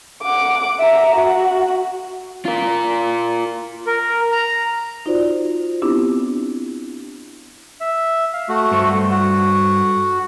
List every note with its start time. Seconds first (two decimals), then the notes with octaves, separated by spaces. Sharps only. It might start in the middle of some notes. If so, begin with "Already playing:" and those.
0.23 F#5 D6
0.80 E5 A#5
1.15 F#4
2.45 F4 A#4
3.87 A#4
4.32 A#5
5.06 D#4 F4 F#4 C5 D5
5.82 B3 C4 D4 E4 G4
7.80 E5
8.33 F5
8.49 A3 F#4
8.71 G2 A4 C5
9.11 F#4